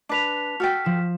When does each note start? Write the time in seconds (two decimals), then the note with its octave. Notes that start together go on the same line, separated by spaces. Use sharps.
0.09 D4 B4 A5 B6 F7
0.60 F#4 A4 G5 F6 B6
0.85 F3 E7